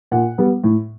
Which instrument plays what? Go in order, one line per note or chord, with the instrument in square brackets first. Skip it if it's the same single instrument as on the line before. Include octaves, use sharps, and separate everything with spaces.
[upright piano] A#2 F#5
G3 B3
A2